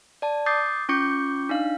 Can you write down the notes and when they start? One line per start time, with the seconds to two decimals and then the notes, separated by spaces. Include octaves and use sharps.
0.22 D5 A5
0.46 D6 D#6 G6 A6 C7
0.89 C#4 F4 C#6 D6 G6 C#7
1.49 D4 D#4 F5